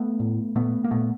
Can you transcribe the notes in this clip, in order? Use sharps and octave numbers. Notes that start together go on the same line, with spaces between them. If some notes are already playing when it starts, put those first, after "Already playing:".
Already playing: A3 B3
A2
A#2 A3 B3
A#3
A#2 A3 B3